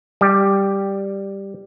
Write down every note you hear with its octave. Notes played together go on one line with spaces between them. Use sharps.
G3 G4